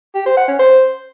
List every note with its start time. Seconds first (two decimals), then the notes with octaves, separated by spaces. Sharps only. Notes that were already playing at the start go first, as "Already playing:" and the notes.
0.15 G4
0.26 C5
0.37 F#5
0.48 C#4
0.59 C5